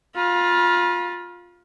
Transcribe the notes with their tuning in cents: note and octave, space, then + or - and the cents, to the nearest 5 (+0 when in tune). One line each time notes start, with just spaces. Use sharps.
F4 +15 B5 -40